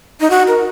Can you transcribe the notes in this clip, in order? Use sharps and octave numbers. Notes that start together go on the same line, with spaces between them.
D#4
F#4
A#4